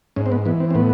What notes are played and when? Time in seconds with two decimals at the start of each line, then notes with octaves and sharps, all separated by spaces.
0.16 G#2 C#4
0.26 C4
0.32 B3
0.46 E3 B3
0.60 C4
0.70 C4
0.75 A2 B3